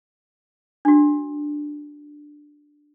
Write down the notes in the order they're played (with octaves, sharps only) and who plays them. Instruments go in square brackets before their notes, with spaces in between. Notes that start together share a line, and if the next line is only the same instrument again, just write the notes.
[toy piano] D4 F#4